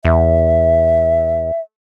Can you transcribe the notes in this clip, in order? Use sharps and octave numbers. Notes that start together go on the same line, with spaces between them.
E2 E5